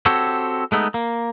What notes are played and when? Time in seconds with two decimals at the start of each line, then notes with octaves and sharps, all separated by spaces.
0.06 C4 F#4 G4 A4 C#5
0.72 G#3 A3 B3 D#4
0.94 A#3